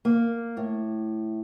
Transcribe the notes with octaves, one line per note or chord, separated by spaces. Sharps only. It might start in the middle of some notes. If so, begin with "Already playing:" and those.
A#3
A2